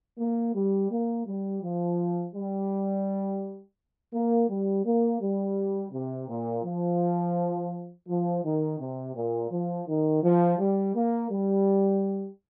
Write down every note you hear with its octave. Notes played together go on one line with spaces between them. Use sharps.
A#3
G3
A#3
G3
F3
G3
A#3
G3
A#3
G3
C3
A#2
F3
F3
D#3
C3
A#2
F3
D#3
F3
G3
A#3
G3